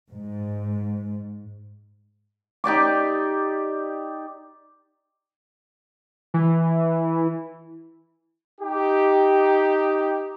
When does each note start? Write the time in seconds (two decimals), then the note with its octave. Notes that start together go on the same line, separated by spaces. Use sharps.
0.11 G#2
2.64 D#4 G4 D5 D6
6.34 E3
8.60 D#4 G4